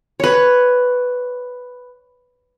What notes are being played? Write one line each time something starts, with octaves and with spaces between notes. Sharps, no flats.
B4 C#5